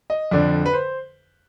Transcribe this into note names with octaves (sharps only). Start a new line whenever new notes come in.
D#5
F2 D3 D5
B4
C5